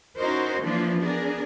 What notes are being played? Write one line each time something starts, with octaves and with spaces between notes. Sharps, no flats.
C#4 D#4 E4 F#4 A#4 C5
E3 F3 A#3 C4 D4 F4
B3 D4 G#4 A#4